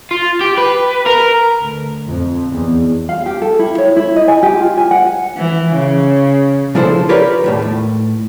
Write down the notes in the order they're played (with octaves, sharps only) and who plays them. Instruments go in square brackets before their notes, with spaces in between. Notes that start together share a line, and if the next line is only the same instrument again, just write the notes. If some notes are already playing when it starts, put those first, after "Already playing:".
[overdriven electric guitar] F4
G4
B4
A#4
[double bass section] D2
F2
E2
[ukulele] F5
G4
A4
E4
C#5
E4
D#5
G#5
G4
F4
G#5
F#5
[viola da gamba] E3
C#3
[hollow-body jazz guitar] C#3 F3 D4 E4 A4 C5
F4 G4 A#4 B4 C#5 D5
D#2 A2 D#3
A2